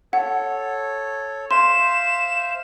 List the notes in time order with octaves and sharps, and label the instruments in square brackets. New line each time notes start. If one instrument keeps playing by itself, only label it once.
[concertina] A4 C#5 [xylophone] F#5
[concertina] C5 E5 F5 [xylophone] C6 [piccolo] E7